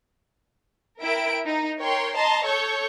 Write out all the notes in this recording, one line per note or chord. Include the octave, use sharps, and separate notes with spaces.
E4 A#4 E5 G5 D7
D#4
A#4 C#5 G5 C6
D#5 A5 A#5 C6
A4 C#5 C#6 G6